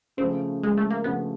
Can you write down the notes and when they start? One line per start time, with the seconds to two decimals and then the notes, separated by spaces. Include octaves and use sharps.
0.17 C#3 F3 A3 C4
0.63 G#3
0.77 A3
0.91 A#3
1.04 C#3 F3 A3 B3